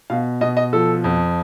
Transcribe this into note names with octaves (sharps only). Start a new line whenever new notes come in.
B2 F5
B2 D#5
D#5
F3 A4
F2